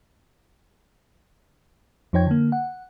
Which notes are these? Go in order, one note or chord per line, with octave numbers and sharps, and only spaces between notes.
F2 F3 D#4 C#5 G5 G#6
D3 A#3
F#5